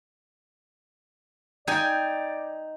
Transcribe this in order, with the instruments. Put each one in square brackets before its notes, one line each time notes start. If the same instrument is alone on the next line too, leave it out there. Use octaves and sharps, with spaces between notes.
[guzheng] D#4 G5 G#5 [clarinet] D5